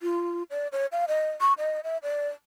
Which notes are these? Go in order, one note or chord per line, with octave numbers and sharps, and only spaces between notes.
F4
D5
C#5
F5
D#5
C#6
D#5
E5
D5